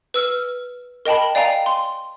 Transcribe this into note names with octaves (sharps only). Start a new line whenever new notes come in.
B4 E6 F6
A#4 D#5 G5 A5 B5
D5 F5 G5 G#5 A#5
C6